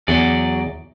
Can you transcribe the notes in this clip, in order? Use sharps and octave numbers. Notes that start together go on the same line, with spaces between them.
E2 F#3 G#4 D5